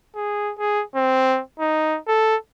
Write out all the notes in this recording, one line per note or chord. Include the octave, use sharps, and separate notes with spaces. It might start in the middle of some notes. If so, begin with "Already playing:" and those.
G#4
G#4
C4
D#4
A4